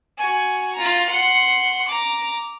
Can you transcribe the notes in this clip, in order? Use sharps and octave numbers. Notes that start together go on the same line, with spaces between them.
F#4 G#5
F4 A#5
F#5 C6
A#5 D6